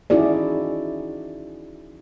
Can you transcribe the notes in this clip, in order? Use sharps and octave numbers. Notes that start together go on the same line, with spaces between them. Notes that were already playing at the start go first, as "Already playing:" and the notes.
C#4 D#4 E4 F#4 G#4 D5